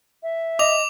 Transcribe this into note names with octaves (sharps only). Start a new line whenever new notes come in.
E5
D#5 D6 F7